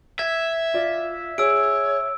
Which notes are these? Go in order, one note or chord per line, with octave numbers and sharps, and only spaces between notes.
E5 G#6
F4 D5
G#4 C#5 E6 D7